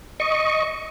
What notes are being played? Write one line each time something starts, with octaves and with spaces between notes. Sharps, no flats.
D#5 C#6